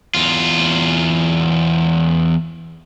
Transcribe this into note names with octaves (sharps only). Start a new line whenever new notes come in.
E2 F4